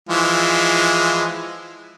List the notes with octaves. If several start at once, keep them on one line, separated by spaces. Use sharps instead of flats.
E3 F3 G#3